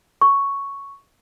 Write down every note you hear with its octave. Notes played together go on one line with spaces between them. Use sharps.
C#6